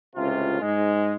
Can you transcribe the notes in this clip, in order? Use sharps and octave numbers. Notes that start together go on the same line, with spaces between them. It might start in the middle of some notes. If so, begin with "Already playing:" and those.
C#2 A2 C3 F4
G#2 G#3